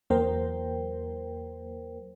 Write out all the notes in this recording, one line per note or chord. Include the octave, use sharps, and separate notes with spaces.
E2 F#3 A#3 A#4 C5 G5